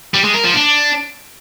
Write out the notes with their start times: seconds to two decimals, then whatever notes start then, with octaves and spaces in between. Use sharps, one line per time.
0.14 G3
0.24 G#3
0.34 A#4
0.45 F3
0.55 D4